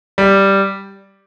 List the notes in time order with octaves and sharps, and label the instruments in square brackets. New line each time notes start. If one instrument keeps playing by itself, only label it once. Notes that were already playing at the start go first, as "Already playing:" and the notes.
[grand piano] G3